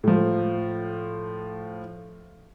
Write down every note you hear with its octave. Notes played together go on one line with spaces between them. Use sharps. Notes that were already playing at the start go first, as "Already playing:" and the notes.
A2 F3